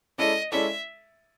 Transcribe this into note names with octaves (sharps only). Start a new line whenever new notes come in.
G#3 C#4 E4 A4 D5 D#5
G#3 C#4 E4 A4 D5 E5